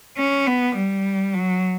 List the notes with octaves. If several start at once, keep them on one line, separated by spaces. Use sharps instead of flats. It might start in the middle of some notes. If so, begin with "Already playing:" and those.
C#4
B3
G3
F#3